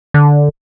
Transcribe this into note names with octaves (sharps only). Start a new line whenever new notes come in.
D3